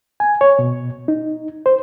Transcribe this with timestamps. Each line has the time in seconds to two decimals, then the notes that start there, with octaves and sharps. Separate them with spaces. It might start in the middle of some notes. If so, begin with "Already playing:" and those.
0.20 G#5
0.41 C#5
0.59 B2
1.08 D#4
1.66 C5